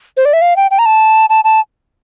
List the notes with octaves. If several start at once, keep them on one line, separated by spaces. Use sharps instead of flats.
C5
D5
E5
F5
G5
G5
A#5
A5
A5
A5